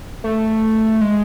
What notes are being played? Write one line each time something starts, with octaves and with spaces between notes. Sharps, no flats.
A3
G#3